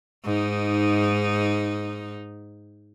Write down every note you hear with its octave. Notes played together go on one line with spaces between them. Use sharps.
G#2 D#4